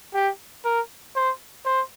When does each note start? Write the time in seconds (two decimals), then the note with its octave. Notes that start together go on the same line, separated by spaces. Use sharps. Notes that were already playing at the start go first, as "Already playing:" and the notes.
0.14 G4
0.65 A#4
1.15 C5
1.66 C5